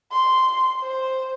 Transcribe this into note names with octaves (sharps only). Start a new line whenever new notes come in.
C6
C5